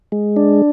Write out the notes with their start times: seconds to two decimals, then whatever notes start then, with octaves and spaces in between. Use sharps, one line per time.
0.12 G#3
0.36 D4